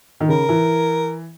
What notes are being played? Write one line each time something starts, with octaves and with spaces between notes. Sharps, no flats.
D#3
C#3 A#4
E3